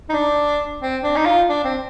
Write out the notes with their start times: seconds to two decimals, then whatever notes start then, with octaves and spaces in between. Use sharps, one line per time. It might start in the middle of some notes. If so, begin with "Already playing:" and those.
0.10 D#4
0.13 D4
0.81 C4
1.03 D4
1.16 D#4
1.26 F4
1.48 D4
1.64 C4